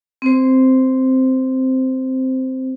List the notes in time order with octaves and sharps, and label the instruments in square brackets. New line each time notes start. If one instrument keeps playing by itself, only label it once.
[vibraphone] C4 C5